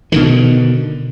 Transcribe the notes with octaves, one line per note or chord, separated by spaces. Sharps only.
B2 D3 D#3